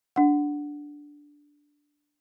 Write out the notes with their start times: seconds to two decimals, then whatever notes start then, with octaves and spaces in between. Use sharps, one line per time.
0.16 D4 F#5